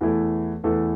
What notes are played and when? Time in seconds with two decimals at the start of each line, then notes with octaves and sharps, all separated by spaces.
0.01 E2 E3 A3 E4 A4
0.64 E2 E3 A3 E4 A4